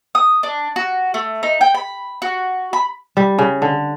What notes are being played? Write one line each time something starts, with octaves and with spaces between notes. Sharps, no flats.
D#6
D4
F#4
A3
D#4
G5
B5
F#4
B5
G3
C#3
D3